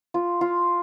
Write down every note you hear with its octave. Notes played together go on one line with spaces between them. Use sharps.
F4
F4